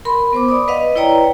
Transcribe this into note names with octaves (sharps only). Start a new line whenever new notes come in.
A#4 B5 C6
B3 C5 D6
D5 B5 D#6
B4 D#5 F5 F#5
E4 B4 C#5 D5 G5 A#5